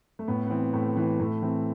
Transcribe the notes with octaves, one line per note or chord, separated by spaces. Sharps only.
A3
A2 B3
B3
E3 C4
A2 A3
E3
A2 A3
E3 C4